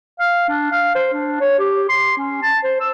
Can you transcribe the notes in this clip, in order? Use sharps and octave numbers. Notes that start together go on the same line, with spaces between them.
F5
D4
F5
C5
D4
C#5
G4
C6
C#4
A5
C5
E6